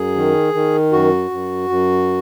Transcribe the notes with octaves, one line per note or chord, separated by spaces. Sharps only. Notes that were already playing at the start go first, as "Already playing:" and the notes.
Already playing: F#2 G#4
D#3
D#3
F#2 F#4
F#2
F#2